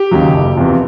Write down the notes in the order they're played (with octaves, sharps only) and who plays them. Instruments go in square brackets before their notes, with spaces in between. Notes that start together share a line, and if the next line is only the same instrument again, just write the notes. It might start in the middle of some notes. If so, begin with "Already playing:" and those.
Already playing: [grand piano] G4
D#2 C#3 F#3
F#1
E2 C3 F3